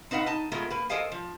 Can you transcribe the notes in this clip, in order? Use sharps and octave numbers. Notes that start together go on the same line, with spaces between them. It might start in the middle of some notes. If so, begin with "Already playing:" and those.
C4 D#4 B4 F5 F#5
D#4 A5
G#3 A3 B3 F4 A#4
A#3 B4
A4 A#4 C5 D#5 F5 G#5
F3